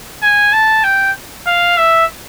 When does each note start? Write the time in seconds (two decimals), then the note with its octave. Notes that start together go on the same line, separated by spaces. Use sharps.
0.23 G#5
0.53 A5
0.84 G5
1.47 F5
1.77 E5